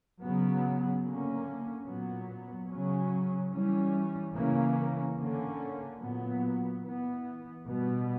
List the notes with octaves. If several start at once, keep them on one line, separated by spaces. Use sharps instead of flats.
C#3 F#3 B3
D3 A#3 C#4
A#2 F#3 B3
C#3 F#3 C#4
E3 G3 C#4
C#3 E3 A#3 C#4
D3 A#3 C#4
A#2 F#3 B3
E3 B3
B2 G3 B3